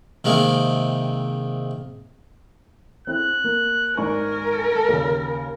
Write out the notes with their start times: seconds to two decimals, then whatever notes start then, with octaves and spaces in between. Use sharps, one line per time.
0.24 C3 D#3 G#3 A#3
3.07 C4 E4 G#4 F#6
3.44 A#3
3.97 G#2 A#4 D5 G#5 C#6
4.88 D#2 C#3